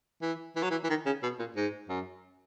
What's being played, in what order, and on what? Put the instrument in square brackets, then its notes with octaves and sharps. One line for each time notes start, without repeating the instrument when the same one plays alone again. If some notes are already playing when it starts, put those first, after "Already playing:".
[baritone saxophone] E3
E3
F#3
E3
E3
D#3
C#3
B2
A#2
G#2
F#2